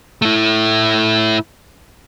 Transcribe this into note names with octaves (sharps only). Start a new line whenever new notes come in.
A3 E4